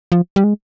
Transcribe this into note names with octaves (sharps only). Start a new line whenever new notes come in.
F3
G3
G#3